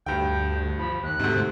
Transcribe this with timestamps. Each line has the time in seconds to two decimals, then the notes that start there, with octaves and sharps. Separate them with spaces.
0.06 D2 G2 G5 G6
0.79 F3 B5
1.03 D#2 F#6
1.19 D2 G#2 C3